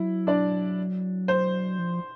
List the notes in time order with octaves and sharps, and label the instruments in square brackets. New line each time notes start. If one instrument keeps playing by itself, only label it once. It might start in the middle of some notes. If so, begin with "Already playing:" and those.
Already playing: [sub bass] F#3 [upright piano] E4
[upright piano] D4 D5
C5
[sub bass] F3